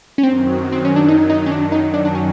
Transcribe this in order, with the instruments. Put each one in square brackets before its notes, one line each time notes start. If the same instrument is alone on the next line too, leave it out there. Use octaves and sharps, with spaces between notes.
[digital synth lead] C#4
[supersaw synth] F#2 D#3 F#3 [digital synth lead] C4
[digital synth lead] C4
C#4
D4
D#4
D#4
C#4
D4
D#4
D4
D4
C#4